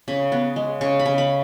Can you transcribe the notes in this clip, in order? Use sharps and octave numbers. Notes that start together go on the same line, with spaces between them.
C#3 B5
B3
G#3
C#3 C#6
B5
C#3
B5